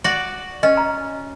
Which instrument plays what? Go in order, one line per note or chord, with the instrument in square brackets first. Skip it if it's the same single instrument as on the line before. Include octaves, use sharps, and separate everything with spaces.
[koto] F#4 D5
[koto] C#4 [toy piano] D#5
[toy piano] A#5